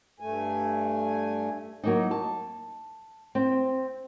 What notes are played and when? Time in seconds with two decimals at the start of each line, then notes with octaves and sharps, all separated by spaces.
0.20 G2 A3 G#5
1.83 F#3 A#3 D#4
2.11 A5
3.35 C4